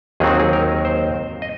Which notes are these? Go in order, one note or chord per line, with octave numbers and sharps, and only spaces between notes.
D#2 D#3 F#3 C4 D#4 G#4
F#4
G#4
A#4
C5
D#5